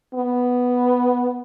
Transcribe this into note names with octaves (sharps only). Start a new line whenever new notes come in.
B3